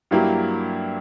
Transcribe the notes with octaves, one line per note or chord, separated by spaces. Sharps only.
G2 F#3 A#3 E4 G4